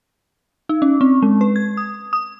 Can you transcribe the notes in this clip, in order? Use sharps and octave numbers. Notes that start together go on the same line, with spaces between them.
D#4
C#4
C4
G#3
B4
G#6
D#6
D#6